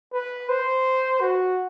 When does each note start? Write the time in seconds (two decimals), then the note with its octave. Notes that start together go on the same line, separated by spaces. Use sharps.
0.13 B4
0.49 C5
1.21 F#4